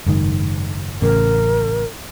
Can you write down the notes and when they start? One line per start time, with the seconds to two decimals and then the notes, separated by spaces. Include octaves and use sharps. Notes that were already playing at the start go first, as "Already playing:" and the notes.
0.06 F#1 G#2 D#3
1.02 A1 C#3 A#4